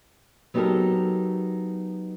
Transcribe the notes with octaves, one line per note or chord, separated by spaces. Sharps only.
F#3 B3 D#4 G4 A4 A#4